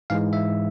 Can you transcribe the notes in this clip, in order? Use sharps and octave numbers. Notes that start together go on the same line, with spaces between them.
G#2 E3 G#3 F5
E5